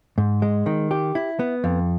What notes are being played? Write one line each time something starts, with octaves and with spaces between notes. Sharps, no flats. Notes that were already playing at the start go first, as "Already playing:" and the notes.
G#2
G#3
D#3
G4
E4
B3
F2